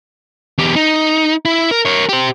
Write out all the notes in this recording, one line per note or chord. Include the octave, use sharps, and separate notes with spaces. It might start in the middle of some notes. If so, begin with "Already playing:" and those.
E2 G4
D#4
E4
A#4
A#4 C#5
G4 C5